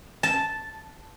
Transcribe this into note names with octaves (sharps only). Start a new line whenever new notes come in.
A5